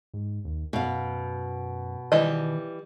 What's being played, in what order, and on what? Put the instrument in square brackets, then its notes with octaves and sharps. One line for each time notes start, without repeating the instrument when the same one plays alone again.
[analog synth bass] G#2
D#2
[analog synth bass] F#2 [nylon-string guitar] B2 F5
[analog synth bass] D#3 [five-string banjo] E3 G3 D#5